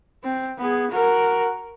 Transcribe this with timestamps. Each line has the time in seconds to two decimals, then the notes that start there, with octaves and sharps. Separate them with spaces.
0.24 C4
0.58 B3 G#4
0.91 F#4 A#4